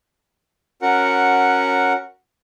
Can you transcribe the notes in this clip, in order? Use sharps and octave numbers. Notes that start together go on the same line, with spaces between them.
C#4 F#4 A#4 F#5